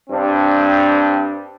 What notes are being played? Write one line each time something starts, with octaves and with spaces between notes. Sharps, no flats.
G2 C4 D4